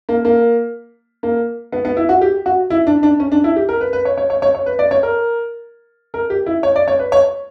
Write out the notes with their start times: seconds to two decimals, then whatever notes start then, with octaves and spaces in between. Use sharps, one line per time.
0.09 A#3
0.25 A#3
1.23 A#3
1.72 B3
1.85 B3
1.97 E4
2.09 F#4
2.21 G4
2.46 F#4
2.70 E4
2.87 D4
3.03 D4
3.20 C#4
3.32 D4
3.44 E4
3.56 G4
3.69 A#4
3.81 B4
3.93 B4
4.05 C#5
4.18 C#5
4.30 C#5
4.42 C#5
4.55 C#5
4.66 B4
4.79 D5
4.91 C#5
5.03 A#4
6.14 A#4
6.30 G4
6.46 E4
6.63 C#5
6.76 D5
6.88 C#5
6.99 B4
7.12 C#5